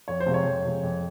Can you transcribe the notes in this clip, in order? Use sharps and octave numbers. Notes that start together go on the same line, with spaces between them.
F2 C#5
C5
C3 F3 G#3
C#5
F2
C3 F3 G#3
F2